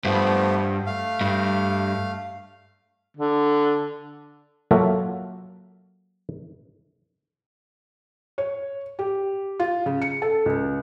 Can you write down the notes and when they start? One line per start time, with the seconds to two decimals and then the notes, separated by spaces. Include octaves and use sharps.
0.05 G2 F3 A3 B3
0.86 A3 F5
1.21 G2
3.17 D3
4.71 F#3 A#3 F4 F#4 A4 E5
8.38 C#5
8.99 G4
9.60 F4
9.86 C#3
10.02 C#7
10.22 A4
10.46 C#2